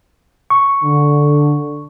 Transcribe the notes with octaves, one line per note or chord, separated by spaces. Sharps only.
C#6
D3